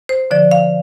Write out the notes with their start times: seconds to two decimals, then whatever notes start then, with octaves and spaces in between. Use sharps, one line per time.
0.09 C5
0.31 D3 F3 D5
0.51 F5